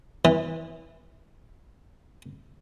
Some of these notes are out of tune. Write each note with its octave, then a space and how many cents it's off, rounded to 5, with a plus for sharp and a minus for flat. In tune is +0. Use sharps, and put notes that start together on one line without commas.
E3 -20